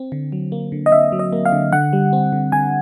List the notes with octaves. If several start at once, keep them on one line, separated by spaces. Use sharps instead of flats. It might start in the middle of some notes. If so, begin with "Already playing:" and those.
Already playing: C4
D3
F#3
A#3
D3
D#5
D3 E5
F#3
D#5
A#3
F5
D3
D3 F#5
G3
C4
D3
D3 G#5